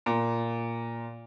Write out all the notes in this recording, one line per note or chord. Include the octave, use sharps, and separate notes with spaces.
A#2